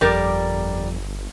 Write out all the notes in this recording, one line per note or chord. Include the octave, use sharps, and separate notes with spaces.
G1 F2 G3 A#4 D5